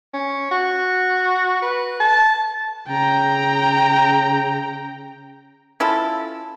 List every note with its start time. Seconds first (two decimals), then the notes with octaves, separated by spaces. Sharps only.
0.14 C#4
0.51 F#4
1.62 B4
2.00 A5
2.88 C#3 G5 A#5
5.80 C#4 E4 F4 A4